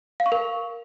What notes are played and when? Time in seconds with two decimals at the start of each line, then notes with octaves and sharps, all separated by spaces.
0.20 F5
0.26 C#6
0.32 A#4